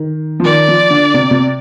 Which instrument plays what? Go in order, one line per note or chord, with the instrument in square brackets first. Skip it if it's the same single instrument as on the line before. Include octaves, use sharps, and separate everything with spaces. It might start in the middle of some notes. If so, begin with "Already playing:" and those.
Already playing: [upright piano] D#3
F3
[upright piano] D#3 [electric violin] D5
[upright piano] F3
D3
C3
C3